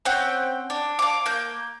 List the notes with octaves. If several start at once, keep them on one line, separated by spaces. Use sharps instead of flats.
C4 C#4 F#5 G5
D4
F5 A5 D6
A#3 G6